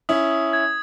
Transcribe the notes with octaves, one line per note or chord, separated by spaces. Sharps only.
C#4 E4 D#6
D#6
G#6